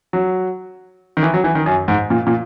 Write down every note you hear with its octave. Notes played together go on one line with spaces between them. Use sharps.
F#3
D#3
E3
F#3
E3
D#3
F#2
G#2
A#2
A#2